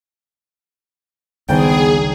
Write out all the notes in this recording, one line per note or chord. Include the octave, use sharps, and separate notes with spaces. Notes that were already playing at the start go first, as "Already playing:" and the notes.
G#1 C#2 G2 B3 G#4 G5